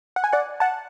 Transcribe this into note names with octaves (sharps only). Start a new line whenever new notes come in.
F#5
G#5
D5 F#5
F#5 A5